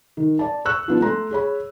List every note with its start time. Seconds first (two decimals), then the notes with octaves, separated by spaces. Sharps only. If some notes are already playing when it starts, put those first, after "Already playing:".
0.17 D#3
0.39 D5 A5
0.65 C#6 E6 F#6
0.88 F3 B3 D4
1.01 A3 A#5 C6
1.31 G#4 C#5 B5